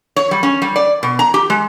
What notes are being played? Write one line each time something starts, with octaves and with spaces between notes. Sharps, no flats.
C#5
G3
C#4
G3
D5
B2
A#5
G4
G#3